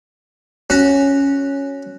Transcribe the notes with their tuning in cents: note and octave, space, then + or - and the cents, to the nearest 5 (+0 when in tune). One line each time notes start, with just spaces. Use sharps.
C#4 +0 F#4 +0